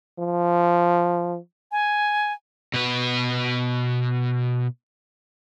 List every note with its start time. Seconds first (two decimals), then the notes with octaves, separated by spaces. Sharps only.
0.19 F3
1.72 G#5
2.74 B2 B4